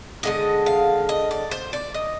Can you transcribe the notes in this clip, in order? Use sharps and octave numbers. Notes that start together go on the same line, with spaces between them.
D3 G#3 D#4 D#5
F5
D#5
D5
C5
D5
D#5